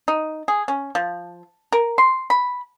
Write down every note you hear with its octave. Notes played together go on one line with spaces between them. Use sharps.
D#4
G#4
C#4
F3
A#4
C6
B5